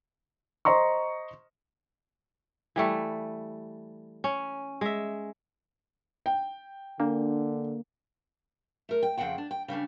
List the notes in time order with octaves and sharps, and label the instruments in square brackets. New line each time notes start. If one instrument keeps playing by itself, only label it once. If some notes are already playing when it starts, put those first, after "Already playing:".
[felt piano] C5 D#5 A#5 C6 C#6
[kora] E3 G3 A3
C#4
G#3 E5
[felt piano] G5
[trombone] D3 [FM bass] A#3 [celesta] D4
[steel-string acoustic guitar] A3 A#4
G5
F2 C#3 C4 F#5 G5
D4
G5
C#3 G3 C#4 D4